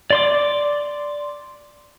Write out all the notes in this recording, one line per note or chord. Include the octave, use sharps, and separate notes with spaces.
D5 C6 D6